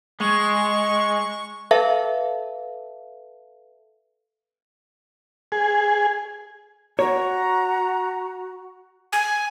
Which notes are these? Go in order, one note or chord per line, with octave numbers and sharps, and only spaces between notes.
G#3 C#6
A4 B4 E5 F5 A5
G#4
F#4 C#5 A#5
G#5